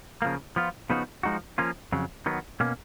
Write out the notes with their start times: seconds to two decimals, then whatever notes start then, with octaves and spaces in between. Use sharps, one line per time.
0.22 C#3 F3 A#3
0.56 F3 B3 F4
0.90 C#3 F3 B3 D#4 F#4
1.23 F3 G#3 D#4 F#4
1.58 F3 A#3 C#4 F4
1.92 F2 C#3 F#3
2.26 D#3 F#3 B3
2.60 B2 A#3 C#4